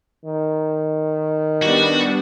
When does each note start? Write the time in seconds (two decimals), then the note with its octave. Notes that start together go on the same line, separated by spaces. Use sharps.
0.25 D#3
1.62 G3 B3 D4 F#4